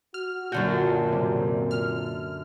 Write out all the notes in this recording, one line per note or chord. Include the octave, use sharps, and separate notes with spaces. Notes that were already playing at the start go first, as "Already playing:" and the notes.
F#4 F6
F#2 A#2 D3 F#4 G5
C3
F6